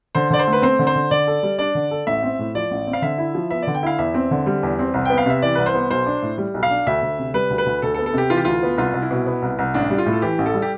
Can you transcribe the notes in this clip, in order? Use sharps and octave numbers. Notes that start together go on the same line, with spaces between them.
D3 C5
D3 D5
C5
A3
B4
C4 C5
D3
C5
D3
D3 D5
A4
G3
D4 D5
D3
A4
A1 E5
C4
A2
F3 D5
A1
C4
F5
D3 E5
E4
F3
B3 E5
D3 D5
G5
E4 F5
E2 E5
C4
D3
G3
E2
C4
C2
B3 G5
F5
C3 E5
E3 D5
C2 B4
C5
B3
B1 C5
D4
A2
G3
B1
F5
D4
D2 E5
D2
C3
G3 B4
D2
B4
D2
D2 A4
A4
B3
A4
C3 G4
E3 F4
G4
D2 F4
B3
C2 F4
C2
E4
B2
B3
C2
C2
A1 D4
G3
F4
A2
A4
E3 G4
A1
A4
G3
G4